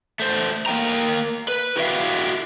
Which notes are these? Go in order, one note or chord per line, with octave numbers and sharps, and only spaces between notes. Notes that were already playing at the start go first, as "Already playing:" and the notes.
A3 C5
A#3 A#4 G5 A#5
B4
E4 F#4 G4 C#5 E5 F5